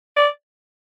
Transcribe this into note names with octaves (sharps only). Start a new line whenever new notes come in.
D5